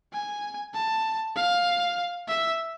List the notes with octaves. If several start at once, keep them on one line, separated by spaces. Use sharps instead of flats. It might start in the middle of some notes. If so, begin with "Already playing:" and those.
G#5
A5
F5
E5